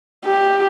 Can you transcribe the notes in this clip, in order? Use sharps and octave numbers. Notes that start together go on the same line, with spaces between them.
G4